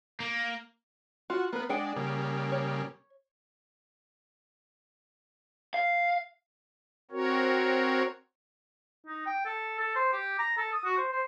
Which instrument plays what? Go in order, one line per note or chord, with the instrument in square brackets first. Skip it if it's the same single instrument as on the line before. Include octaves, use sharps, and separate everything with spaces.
[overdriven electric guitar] A#3
[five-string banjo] F4 [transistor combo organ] F#4
[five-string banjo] A#3 B4 [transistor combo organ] B3
[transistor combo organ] G#3 D4 [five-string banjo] G#4 F#5 G5
[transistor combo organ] C#3 G3 A#3
[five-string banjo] C#5
[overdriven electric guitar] F5
[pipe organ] C4 F#4 A#4 C#5
[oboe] D#4
G5
A4
A4
C5
G4
A#5
A4
D#6
F#4
C5
C5